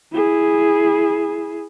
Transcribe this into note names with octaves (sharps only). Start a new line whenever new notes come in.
E4 G#4